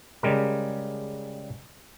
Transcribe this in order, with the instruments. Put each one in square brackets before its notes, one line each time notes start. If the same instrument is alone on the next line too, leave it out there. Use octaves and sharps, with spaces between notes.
[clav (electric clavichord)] C#3 G3 G#3 A#4